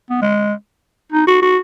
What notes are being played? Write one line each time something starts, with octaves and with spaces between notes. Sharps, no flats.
B3
G#3
D#4
F#4
F#4